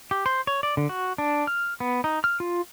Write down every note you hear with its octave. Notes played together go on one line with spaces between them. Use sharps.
G4
C5
C#5
D5
D3
F#4
D4
F6
B3
D#4
F6
F4